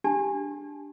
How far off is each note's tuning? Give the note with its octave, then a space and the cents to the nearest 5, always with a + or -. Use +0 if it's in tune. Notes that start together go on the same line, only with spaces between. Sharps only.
D4 +0 G4 +0 A5 -30